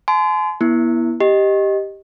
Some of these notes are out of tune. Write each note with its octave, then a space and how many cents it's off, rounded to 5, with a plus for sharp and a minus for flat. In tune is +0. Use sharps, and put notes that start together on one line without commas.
G#5 +45 C6 -30
B3 -35 E4 +0
G4 +0 D#5 +0